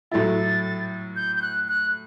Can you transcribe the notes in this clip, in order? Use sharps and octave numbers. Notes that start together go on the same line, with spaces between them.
A2 F#3 A3 E4 A6
G6
G6
F#6
F#6